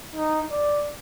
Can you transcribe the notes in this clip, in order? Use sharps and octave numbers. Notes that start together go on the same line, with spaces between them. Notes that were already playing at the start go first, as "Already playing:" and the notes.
D#4
D5